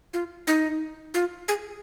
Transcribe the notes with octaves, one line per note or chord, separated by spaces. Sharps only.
F4
D#4
F4
G#4